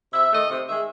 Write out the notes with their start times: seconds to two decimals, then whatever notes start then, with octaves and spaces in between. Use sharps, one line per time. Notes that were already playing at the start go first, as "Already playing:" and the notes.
0.13 C3 E5
0.32 D#3 A3 D#5
0.50 C3
0.68 D#3 G#3 E5